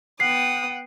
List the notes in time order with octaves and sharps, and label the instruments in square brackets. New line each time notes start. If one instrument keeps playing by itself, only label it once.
[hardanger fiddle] B3 D#6 [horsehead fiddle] F#5 G5 [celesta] C7